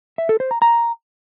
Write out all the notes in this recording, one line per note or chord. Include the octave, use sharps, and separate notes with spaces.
E5
A4
C5
A#5
A#5